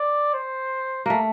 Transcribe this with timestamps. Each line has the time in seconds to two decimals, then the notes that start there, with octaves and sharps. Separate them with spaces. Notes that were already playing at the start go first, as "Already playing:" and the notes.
Already playing: D5
0.34 C5
1.06 A3 A#3